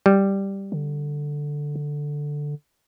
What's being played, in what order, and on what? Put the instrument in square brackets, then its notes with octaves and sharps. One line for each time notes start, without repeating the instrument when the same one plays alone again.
[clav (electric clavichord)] G3
[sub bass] D3